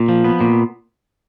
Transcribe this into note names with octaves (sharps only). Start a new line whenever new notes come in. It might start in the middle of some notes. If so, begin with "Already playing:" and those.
Already playing: A#2
F3
B3
A#2